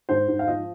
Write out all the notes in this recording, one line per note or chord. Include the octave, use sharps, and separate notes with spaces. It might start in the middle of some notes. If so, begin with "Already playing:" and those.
G#2 C5
G#2
F5
F3 D#5